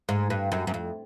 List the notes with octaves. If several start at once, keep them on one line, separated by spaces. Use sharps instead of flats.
G#2
G2
F#2
F#2
F2